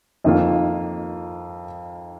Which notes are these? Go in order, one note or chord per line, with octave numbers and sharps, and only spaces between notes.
F2 D#3 A#3 F4